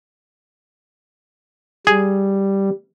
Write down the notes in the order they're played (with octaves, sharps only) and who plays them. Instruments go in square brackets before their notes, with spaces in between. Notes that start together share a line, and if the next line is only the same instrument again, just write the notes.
[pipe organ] G3 [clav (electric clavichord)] G#4